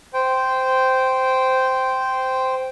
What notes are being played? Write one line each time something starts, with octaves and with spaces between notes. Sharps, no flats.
C5 G5